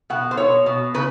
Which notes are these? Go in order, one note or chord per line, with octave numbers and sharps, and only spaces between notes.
B2 F#5
C5
B2 C#5
B2
C#3 B4